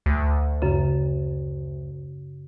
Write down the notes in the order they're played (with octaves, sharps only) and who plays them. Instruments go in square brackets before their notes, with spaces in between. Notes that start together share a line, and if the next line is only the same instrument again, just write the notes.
[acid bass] D2
[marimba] F#2 C#3